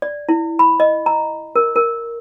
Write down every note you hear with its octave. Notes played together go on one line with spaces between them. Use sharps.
D5
E4
B5
D#5
A#5
A#4
A#4